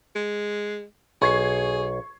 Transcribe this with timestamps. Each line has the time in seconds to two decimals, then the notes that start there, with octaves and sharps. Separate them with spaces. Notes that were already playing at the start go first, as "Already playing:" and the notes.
0.16 G#3
1.22 B1 G#4 C#6 G#6 C7